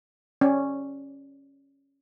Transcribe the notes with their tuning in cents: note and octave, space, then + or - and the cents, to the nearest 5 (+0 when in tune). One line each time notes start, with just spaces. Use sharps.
C#4 -5 D5 -10